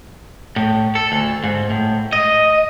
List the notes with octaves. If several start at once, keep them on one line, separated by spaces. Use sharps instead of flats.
A2
A4
D2
G#2
A2
D#5